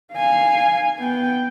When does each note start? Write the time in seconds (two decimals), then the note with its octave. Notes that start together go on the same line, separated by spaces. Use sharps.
0.14 F5 G#5
0.99 B3 G5